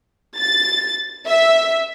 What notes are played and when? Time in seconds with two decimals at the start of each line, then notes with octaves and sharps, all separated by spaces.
0.38 A6
1.26 E5